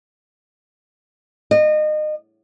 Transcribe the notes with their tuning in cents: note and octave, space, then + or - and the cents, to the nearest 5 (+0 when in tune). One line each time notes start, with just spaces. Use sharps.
D#5 -30